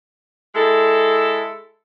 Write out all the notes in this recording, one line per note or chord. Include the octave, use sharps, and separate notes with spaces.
G#3 E4 A4